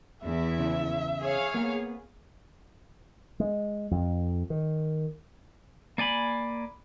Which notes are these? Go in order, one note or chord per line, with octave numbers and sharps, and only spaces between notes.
E2 E4 E5
C#3
G#4 C#5 F5
A#3 B3
G#3
F2
D#3
A#3 D5 G#5 B5